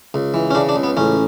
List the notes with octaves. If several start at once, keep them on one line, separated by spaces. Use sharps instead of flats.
C#2
E3
C#4
C#3 D4
D4
C#2
B3
A1 C#4